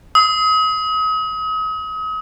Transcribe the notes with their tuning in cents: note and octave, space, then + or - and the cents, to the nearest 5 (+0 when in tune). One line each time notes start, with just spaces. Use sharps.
D#6 +40